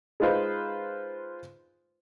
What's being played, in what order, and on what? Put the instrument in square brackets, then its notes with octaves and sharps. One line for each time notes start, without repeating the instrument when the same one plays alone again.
[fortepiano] G#3 D#4 F4 B4 C5